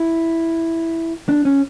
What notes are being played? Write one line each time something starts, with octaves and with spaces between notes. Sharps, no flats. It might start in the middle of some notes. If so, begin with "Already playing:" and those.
Already playing: E4
D4
C#4